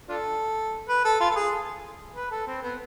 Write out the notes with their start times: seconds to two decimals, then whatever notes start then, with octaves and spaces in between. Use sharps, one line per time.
0.09 D4 F4 A4
0.88 B4
1.05 A4
1.20 F4
1.30 A4
1.36 G#4
2.16 B4
2.31 A4
2.47 C4
2.63 B3